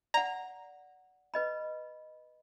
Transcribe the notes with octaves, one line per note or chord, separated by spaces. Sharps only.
D5 F#5 A#5
B4 D#5 B5